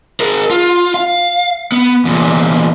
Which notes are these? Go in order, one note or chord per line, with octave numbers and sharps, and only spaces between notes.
G#4 A#4
F4
F5
B3
E2 A#2